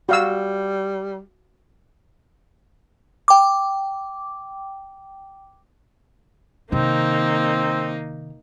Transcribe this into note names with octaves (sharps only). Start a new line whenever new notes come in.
G3 F#4 F5 E6
G5 D6
C3 D#3 A#3 C4 D#4